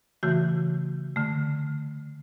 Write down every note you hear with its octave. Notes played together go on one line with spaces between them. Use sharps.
C#3 E3 A3 F#4
D3 A3